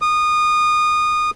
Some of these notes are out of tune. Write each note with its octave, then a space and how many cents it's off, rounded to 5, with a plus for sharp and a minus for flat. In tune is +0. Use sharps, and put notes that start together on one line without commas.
D#6 -25